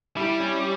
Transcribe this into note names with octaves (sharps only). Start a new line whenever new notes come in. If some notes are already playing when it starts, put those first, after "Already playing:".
G3 E4
C#4